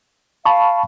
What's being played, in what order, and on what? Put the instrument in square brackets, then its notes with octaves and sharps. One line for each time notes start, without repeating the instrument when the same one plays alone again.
[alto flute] F5 [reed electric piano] A5 B5 C#6